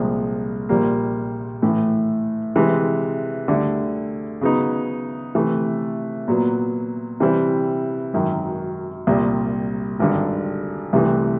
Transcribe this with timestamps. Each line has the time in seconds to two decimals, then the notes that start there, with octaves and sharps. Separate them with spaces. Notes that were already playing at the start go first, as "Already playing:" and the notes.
Already playing: C2 A#2 F3 G#3
0.69 A#1 A#2 G3 A#3
1.62 A2 E3 A3
2.55 C3 E3 G#3
3.48 D2 D3 G3
4.41 C#3 F#3 B3 D#4
5.35 C3 E3 A3
6.28 A#2 F#3 B3
7.20 C3 E3 G3 C4 E4
8.13 G#1 F#2 D#3 F#3
9.07 C2 A#2 G3
9.99 G#1 G2 D3 G3
10.93 C2 C3 E3 A3